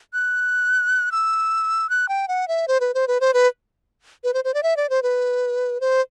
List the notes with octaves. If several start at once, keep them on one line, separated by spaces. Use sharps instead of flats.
F#6
E6
F#6
G5
F#5
E5
C5
B4
C5
B4
C5
B4
B4
C5
C5
D5
E5
D5
C5
B4
C5